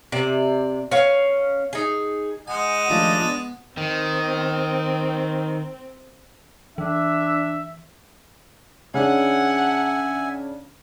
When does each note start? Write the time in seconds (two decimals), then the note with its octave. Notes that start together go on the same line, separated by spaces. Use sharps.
0.12 C3 D5
0.91 C#4 F5
1.73 D#4 G#4
2.47 G#3 D#4 F#5 G#5
2.89 D#2 F3 A3 D4
3.21 B3
3.77 D#3 C4
6.78 E3 D4 E5
8.94 C#3 D4 E5 F#5 G#5